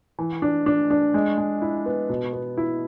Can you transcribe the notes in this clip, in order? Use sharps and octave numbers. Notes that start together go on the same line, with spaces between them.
E3
D4
D4
D4
G#3
G#3
E4
B3
B2
B3
E4